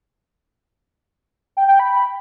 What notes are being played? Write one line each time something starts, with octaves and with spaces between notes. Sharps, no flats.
G5
G5
B5